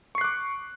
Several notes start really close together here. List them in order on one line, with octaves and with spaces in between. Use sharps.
C#6 C7 F#6 D6